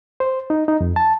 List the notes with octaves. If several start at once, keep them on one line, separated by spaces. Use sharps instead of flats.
C5
D#4
D#4
F2
A5